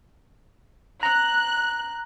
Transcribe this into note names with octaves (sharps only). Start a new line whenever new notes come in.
A#5 F#6